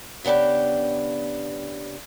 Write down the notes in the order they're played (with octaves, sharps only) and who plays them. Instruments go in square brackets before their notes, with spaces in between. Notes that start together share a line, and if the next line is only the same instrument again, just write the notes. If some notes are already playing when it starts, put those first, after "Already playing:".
[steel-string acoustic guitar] C#3 B3 D4 G4 G5